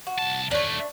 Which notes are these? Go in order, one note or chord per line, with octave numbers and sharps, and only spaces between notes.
F#4
C2 A5
D#2 A3 D4 C#5